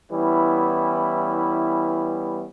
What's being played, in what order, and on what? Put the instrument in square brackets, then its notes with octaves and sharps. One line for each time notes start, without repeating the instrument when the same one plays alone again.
[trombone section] E3 G3 B3 C#4 E4